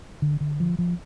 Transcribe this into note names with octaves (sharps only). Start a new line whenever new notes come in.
D3
D3
F3
F3